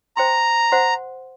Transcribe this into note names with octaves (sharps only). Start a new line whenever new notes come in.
C5 G5 A#5 C6
C5 F#5 C6